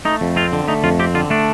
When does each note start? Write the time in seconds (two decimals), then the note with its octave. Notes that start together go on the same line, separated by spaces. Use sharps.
0.05 A3 D#4
0.21 F2
0.36 C4 F4
0.53 D3
0.68 A3 D#4
0.84 F2 F4
0.99 C4 G4
1.14 D3 F4
1.30 A3 D4